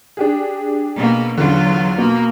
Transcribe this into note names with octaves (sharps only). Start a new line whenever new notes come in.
D4 G4 G#4
B2 A#3
E2 D3 F#3 F4
B2 A#3